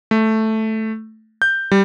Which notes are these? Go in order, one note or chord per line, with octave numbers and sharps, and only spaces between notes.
A3
G6
G3